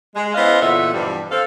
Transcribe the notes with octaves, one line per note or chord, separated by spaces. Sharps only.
G#3
B3 C#4 E4 C5 D#5 F5
E2 A#2 D3 F4 E5 F#5
G2 B2 E3 F3 G3
C4 A4 F5